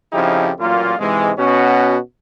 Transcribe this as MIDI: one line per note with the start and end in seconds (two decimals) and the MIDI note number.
0.13 0.50 41
0.13 0.50 49
0.13 0.50 53
0.13 0.50 63
0.13 0.50 64
0.13 0.50 67
0.60 0.95 33
0.60 0.95 46
0.60 0.95 54
0.60 0.95 58
0.60 0.95 65
0.99 1.31 44
0.99 1.31 48
0.99 1.31 52
0.99 1.31 56
1.38 1.98 47
1.38 1.98 61
1.38 1.98 66